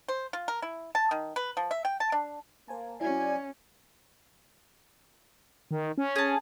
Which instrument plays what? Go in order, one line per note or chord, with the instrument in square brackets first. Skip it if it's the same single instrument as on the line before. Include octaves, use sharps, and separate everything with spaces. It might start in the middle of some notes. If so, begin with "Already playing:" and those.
[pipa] C5
F4
A#4
E4
A5
D#3
B4
F3
E5
G5
A5
D4
[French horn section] A#3 [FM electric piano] C5 G#5 A5
[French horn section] F#3 D5 [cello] C#4 [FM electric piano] E4 F#4 [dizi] G#5
[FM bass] D#3
C#4
[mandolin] G#4 A5